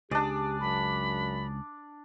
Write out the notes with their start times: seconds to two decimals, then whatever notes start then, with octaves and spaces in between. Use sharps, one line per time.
0.11 C#2 D4 G4 G#4 D5
0.60 F#2 B5